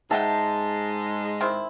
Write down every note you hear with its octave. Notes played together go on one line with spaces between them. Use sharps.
G#2 G#3 E5 F#5 G5 A5
D#3 C4 E4